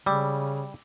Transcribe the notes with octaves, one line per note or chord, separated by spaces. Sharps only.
C#3 G3 D6 E6